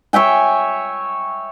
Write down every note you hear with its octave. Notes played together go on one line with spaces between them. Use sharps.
C#5 E5 G5 G#5